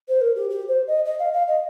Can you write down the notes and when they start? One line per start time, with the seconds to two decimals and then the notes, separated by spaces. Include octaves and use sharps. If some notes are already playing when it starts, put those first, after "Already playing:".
0.08 C5
0.21 A#4
0.35 G4
0.49 G4
0.68 C5
0.87 D#5
1.05 D#5
1.19 F5
1.33 F5
1.47 D#5